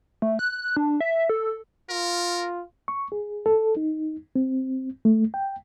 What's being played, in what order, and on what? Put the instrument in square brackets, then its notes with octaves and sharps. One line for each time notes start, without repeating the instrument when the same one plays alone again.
[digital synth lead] A3
F#6
D4
E5
A4
[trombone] F4 [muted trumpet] A#4
[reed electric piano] C#6
G#4
A4
D#4
C4
A3
G5